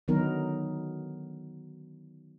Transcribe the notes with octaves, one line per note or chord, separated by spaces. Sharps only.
D3 D#3 F#3 B3 D#4 A#4